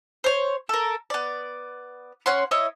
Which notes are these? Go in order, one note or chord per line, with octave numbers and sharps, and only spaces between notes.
C5 C#5
A4 A#4
B3 D5
C#4 C#5 F#5 C6
E4 C#5 D#5